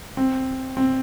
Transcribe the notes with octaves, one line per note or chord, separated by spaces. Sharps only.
C4
C4